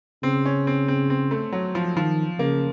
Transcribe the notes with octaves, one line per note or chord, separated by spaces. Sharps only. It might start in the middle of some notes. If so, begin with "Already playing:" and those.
C#3 C4
C#4
C4
C4
C4
A3
F#3
F3
D#3 F3
C#3 A#3